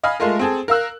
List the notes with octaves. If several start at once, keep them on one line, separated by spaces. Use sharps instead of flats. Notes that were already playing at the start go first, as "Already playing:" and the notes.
D#5 F5 G#5 B5 F6
G#3 A3 F4 A#4
C4 G#4 A4
A#4 F5 E6 F#6